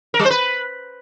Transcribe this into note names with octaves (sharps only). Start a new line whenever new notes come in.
A#4
G3
C5
B4